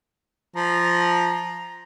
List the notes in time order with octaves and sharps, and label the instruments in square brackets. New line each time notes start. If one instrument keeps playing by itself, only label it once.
[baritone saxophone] F3 [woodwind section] A#5